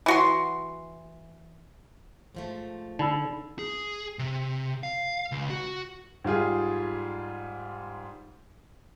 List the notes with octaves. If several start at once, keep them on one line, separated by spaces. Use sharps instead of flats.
E3 F#4 C6
G#2 F3 A3
D3 D#4 D5 B5 E6
G#4
C3
F5
C#2
F#4
G#2 G3 F4 G#4